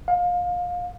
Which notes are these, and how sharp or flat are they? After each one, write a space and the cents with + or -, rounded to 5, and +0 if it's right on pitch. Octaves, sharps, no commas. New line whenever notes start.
F5 +25